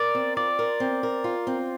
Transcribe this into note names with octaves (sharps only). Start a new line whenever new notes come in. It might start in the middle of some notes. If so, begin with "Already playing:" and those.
Already playing: A#4 D5
C4
F4 D5
A#4
C4
A#4
F4
C4